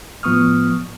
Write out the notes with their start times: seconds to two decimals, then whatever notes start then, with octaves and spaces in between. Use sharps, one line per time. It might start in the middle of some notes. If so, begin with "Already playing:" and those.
0.23 A2 F3 B3 C#6 D#6 F6